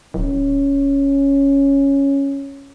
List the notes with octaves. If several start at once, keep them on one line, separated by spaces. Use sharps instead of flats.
D1 C#4